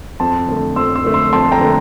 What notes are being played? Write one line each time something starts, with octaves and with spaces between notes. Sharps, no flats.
F2 A5 C6
D3 A3
F2 C6 E6
C6 E6
D3 A3
C6 E6
F2 A5 C6
G5 A#5
D3 A3